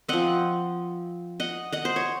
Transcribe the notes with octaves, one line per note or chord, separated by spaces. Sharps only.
F3 C4 D#5 F#5
D#5 F#5
D#5 F#5
C5
C#5